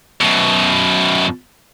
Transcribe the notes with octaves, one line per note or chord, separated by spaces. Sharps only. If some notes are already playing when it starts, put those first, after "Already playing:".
F#2 B2